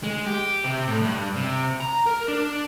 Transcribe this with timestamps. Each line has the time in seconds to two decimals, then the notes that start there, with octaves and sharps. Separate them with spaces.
0.04 G#3
0.27 G4
0.64 C3
0.87 A2
1.02 G2
1.36 C3
1.80 A#5
2.06 A#4
2.28 D4